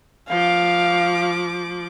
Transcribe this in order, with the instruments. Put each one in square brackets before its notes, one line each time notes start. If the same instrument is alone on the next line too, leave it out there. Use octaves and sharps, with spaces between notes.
[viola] F3 D6 [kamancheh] F5